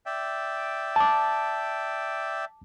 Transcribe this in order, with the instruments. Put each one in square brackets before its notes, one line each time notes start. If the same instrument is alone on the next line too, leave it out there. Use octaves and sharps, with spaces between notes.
[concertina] D5 E5 G5
[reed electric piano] A5 D6